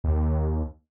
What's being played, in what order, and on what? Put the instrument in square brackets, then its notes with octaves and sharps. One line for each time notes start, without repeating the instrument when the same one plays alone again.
[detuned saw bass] D#2